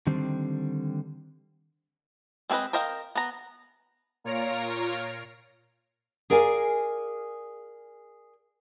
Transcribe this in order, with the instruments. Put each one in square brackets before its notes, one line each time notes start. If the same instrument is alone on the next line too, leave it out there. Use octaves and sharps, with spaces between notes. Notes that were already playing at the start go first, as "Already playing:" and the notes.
[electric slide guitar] D3 D#3 G3 C4 C5
[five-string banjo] G#3 C4 G#4 B4 D#5
A#4 C5 D#5 F5 G5
B3 A#5
[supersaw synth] A#2 F4 C#5 A#5 F6 D7
[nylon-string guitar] G#4 A#4 D5 F5 G#5